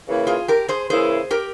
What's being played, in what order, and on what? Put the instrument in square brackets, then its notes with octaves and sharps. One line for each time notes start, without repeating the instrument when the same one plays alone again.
[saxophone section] C#3 E3 A#3 E4
[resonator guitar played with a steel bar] F4 G#4
G4 A#4
G#4 C5
[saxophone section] C#3 E3 A#3 E4 [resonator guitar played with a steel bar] G#4 C5
[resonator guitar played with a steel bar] G4 A#4